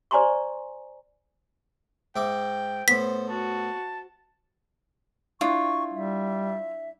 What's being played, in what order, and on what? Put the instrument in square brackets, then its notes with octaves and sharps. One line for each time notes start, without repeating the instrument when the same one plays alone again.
[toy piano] C5 D5 G#5 A#5 C6 C#6
[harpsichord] G#2 E5 D6 [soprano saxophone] G5
[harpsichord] A2 B3 [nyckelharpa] C5 [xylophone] B6
[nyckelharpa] F#4 [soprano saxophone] A5
[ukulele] D4 E4 [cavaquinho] F4 [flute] C#6
[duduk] G3 [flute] E5